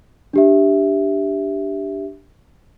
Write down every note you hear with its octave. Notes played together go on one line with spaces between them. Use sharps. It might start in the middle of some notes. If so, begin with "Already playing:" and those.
D4 G4 E5